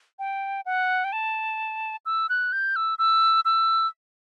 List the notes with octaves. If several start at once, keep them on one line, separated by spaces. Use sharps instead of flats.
G5
F#5
G5
A5
E6
F#6
G6
E6
E6
E6